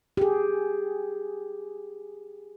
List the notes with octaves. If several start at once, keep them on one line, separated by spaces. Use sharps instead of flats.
G4 G#4